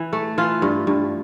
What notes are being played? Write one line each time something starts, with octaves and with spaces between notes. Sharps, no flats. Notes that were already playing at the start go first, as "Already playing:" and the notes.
Already playing: E3
A3
E3 F4
G2
G2